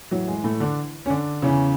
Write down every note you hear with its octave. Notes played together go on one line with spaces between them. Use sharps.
A2 E3 F#3
G#3
A2 A3
D3 D4
C#4
D3 D4
E2 C#3 E3 C#4